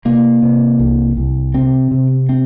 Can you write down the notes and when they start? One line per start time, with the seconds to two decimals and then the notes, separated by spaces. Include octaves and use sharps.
0.05 C3 A#3
0.42 C3
0.79 C2
1.17 C2
1.54 C3 C4
1.91 C3
2.29 C4